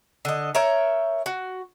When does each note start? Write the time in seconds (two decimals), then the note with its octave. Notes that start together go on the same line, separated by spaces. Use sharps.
0.25 D3 D#5
0.55 A#4 C#5 E5 G5
1.26 F#4